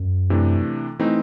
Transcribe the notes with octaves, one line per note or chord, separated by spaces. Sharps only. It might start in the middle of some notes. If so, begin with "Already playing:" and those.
Already playing: F#2
C3 E3 A3 D4
E3 A3 C4 D#4